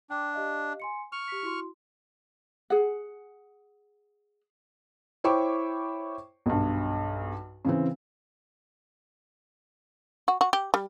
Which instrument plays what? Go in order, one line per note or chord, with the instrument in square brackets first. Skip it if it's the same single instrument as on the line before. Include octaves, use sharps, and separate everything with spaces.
[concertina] D4 [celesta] G5 D6
[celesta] G4 D#5 F5
G#5 C6 C#7
[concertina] C#6 F6 [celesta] F7
[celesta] G4 B6
E4 F#4 C6
[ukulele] G#4 F#5
[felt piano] E4 C5 C#5 G5 C#6 D6
B1 G2
C#3 E3 C4
[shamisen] F#4
F#4
G4
G3